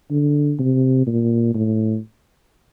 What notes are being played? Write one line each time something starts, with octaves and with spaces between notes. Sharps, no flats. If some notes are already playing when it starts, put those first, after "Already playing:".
D3
C3
A#2
A2